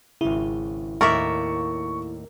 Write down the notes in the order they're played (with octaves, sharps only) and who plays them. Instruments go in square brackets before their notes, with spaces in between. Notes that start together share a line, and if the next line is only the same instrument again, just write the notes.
[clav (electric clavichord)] G#1 C#3 [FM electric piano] E4
[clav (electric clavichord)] D#2 A2 A#3 [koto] A#4 D5 E5 [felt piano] C#6